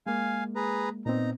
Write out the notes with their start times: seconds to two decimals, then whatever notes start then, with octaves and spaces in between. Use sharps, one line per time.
0.07 G#3 A#3 F5 G#5
0.56 G#4 B4 A#5
1.06 A#2 B3 C4 D#4 A#5